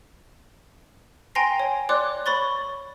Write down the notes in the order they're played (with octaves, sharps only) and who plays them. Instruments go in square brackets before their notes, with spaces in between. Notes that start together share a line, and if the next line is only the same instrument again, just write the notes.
[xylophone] G5 G#5 A#5 C6 A#6 C7
C#5
C#5 D5 C6 D6 F#6
C#5 B5 C#6 A6 G7